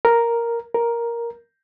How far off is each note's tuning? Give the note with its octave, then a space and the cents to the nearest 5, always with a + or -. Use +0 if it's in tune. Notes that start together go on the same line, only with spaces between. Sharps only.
A#4 +0
A#4 +5